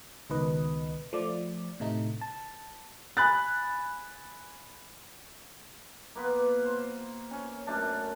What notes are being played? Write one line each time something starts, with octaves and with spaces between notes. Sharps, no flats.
C#2 B2 D#3 B4 D#5
F3 A3 D5
A2 C3 A3 D#4
A5
G#5 B5 F#6 A6
A#3 B3 F4 B4
C5
C#4 C#5 G#5
F#2 A3 D4 A5